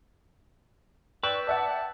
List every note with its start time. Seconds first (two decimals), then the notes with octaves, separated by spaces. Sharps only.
1.23 B4 D5 G5 C#6 E6 F#6
1.47 D5 E5 F#5 A5